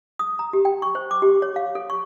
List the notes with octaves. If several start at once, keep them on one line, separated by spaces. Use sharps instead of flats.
D#6
A#5
G4
G5
C#6
C5
D6
G4
C#5
F5
A4
C#6